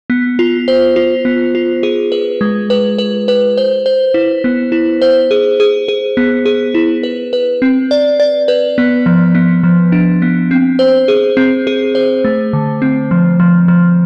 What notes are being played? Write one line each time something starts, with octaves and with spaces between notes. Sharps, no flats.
B3
F4
C5
F4
B3
F4
G#4
B4
G#3
B4
B4
B4
C5
C5
E4
B3
E4
C5
G#4
G#4
G#4
B3
G#4
E4
B4
B4
C4
D5
D5
B4
B3
F3
B3
F3
D4
B3
C4
C5
G#4
C4
G#4
C5
A3
D3
C4
F3
F3
F3